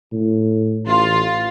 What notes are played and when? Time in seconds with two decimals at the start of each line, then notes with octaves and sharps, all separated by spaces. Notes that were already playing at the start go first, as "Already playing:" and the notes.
0.12 A2
0.86 A1 F4